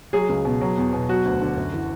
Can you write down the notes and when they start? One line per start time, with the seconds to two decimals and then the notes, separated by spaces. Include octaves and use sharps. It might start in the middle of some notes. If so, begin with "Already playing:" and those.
0.13 F#3 G#4
0.29 C#2
0.45 B2
0.61 F#3
0.78 E2
0.93 B2
1.09 F#3 F#4
1.25 D2
1.42 D3
1.57 F#2
1.73 E3